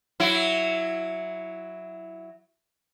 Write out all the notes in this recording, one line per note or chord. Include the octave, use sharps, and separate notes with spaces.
F#3 E4